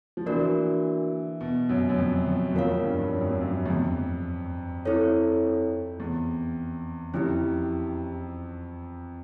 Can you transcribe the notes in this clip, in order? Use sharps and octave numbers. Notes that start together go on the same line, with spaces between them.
F3
E3 A#3 D4 F#4 A#4 D5
B2
F#2
F#2
F2
F2
E2
F2 F4 A#4 C#5 F5
F2
G2
G2
F#2
F2
F#2
F#2
E2
F2
C4 E4 A4 C#5
E2
F2 C#4 E4 G4